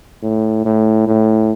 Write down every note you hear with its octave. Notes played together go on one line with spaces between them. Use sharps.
A2
A2
A2